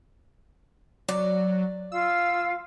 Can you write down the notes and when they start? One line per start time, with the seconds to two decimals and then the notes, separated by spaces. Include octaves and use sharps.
1.09 F#3 D5
1.92 F4 F5 E6